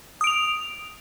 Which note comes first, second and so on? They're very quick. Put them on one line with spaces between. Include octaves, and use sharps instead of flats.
D#6 D7 F7